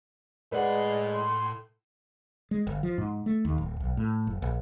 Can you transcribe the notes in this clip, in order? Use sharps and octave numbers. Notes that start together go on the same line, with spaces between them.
A2 G#3 B4 D5 F#5 B5
C6
G#3
G1
F3
G#2
A3
D#2
D1
B1
A2
F#1
A#1